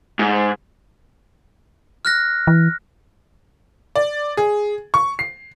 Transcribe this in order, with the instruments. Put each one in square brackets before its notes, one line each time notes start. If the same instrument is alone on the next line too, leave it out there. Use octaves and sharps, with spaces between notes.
[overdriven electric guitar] G#2
[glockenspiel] F6 F#6 A#6
[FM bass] E3
[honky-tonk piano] D5
G#4
C#6
C7